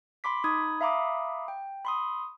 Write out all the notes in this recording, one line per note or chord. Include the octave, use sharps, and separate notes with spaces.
B5 C6 D6 B6
D#4 B5 D#6 G#6
E5 F5 A#5 B5 D6 D#6
G5
B5 C6 D#6